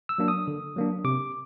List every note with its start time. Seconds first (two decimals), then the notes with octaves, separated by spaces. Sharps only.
0.09 E6
0.18 F#3 A#3 D4
0.28 D#6
0.47 D3
0.76 F#3 A#3 D4
1.04 C3 D6